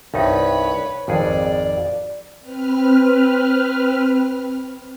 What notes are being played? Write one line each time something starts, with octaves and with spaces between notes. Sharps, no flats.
C2 G2 D#4 B4 C#5
G#1 F2 G#4 D5
C4 B4 F6